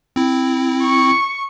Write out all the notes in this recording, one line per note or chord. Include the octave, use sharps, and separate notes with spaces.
C4 E4
C#6